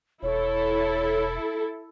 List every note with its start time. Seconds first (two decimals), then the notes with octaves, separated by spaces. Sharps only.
0.23 E1 E4 A4 C#5